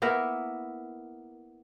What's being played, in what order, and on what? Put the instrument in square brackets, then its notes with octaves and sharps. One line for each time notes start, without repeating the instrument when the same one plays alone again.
[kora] A#3 B3 E4 A#4